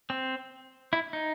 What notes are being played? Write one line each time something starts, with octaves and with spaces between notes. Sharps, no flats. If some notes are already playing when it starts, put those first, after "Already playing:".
C4
E4
D#4